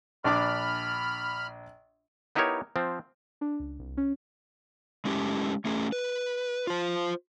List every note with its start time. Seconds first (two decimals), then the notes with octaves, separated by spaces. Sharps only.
0.24 A#1 D4 B5 D6 F6
2.35 B3 D#4 E4 G4 A#4 C#5
2.76 F3 C4
3.41 D4
3.60 C#2
3.79 C2
3.97 C#4
5.05 G#3 A3 C#4 G4
5.65 A3 C#4 G#4
5.92 B4
6.67 F4 C5